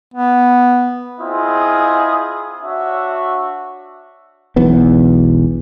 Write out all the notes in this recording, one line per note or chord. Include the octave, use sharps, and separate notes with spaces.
B3
C4 E4 F4 G#4 D#5 D#6
D4 F#4 C#5 E5
E1 B1 E2 B3